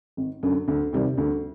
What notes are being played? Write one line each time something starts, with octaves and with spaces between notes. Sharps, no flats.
G#1
F#2 D3
D2
C3 D#3 G3
D2